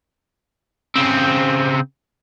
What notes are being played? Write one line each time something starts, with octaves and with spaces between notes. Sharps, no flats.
C#3 C4